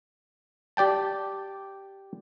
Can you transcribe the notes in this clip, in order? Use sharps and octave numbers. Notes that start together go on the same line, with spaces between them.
G4 D5 G5 A5